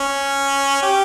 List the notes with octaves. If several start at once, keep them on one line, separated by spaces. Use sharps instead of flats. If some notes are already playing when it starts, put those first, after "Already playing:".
Already playing: C#4
G4